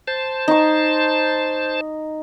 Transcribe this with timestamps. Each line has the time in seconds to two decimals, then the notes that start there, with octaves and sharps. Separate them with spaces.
0.08 C5 A5
0.48 D#4 C#6